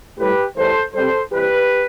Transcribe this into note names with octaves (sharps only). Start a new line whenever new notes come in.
A2 G3 G4 B4
A2 E3 G3 A4 C5
C3 G3 A4 C5
C3 E3 G3 G4 B4